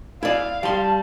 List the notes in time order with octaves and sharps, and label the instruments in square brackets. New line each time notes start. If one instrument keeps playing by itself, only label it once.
[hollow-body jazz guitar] E4 D5 [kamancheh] F5
[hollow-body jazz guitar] G3 C6 [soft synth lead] A5